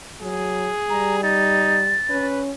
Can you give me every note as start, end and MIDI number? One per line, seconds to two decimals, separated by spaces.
0.22 0.71 54
0.22 1.21 68
0.90 1.97 55
0.90 1.16 82
1.23 1.83 63
1.23 2.25 93
2.10 2.53 61
2.10 2.42 71